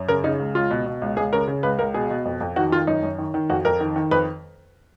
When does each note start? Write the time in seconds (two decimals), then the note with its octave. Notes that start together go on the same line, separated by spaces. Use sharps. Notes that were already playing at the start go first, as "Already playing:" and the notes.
Already playing: F#2
0.08 C#3 A#4
0.24 C#3 D#4
0.39 C#2
0.55 C#2 F4
0.70 B2
0.86 B2
1.02 C#2
1.17 C#2 G#4
1.33 C#3 A#4
1.48 C#3
1.63 C#2 B4
1.79 C#2 A#4
1.94 B2 G#4
2.10 B2
2.25 F2
2.41 F2
2.56 D#3 F#4
2.72 D#3 F4
2.87 F#2 D#4
3.03 F#2
3.18 D#3
3.34 D#3
3.50 F2 F#4
3.65 F2 A#4
3.80 D#3
3.96 D#3
4.11 F2 B4